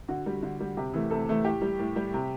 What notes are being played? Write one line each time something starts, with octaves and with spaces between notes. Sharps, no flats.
D3 F#4
G3
D3
G3
C3 G4
E3 A3
C3 A4
E3 A3
A2 G4
G3
A2
G3
C3